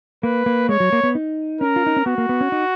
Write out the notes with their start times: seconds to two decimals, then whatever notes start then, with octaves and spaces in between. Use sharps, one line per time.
0.23 A#3 B4
0.46 A#3
0.69 G#3 C#5
0.80 F#3
0.92 A#3
1.03 B3
1.15 D#4
1.61 C#4 A#4
1.76 F4
1.86 D#4
1.96 C#4
2.06 B3 F#4
2.18 A#3
2.29 B3
2.41 C#4
2.52 D#4